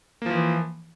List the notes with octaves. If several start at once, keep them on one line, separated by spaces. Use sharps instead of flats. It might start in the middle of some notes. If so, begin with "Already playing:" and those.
E3 F3 A#3